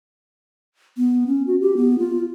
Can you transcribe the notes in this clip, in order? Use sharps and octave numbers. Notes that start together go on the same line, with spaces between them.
B3
C#4
F#4
G4
B3
F4